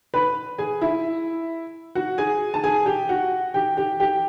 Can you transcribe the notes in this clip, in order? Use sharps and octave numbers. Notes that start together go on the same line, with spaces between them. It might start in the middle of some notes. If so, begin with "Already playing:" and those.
B4 B5
G#4 G#5
E4 E5
F#4 F#5
G#4 G#5
A5
G#4 G#5
G4 G5
F#4 F#5
G4 G5
G4 G5
G4 G5